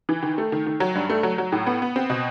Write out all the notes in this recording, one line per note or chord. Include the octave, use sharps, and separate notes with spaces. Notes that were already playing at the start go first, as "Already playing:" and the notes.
E3
D#3
A3
D#3
D#3
F#3
G2
A3
F#3
F#3
A2
B3
B3
C4
B2